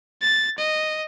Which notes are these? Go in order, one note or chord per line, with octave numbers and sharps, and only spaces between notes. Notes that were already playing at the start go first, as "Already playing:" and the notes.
A6
D#5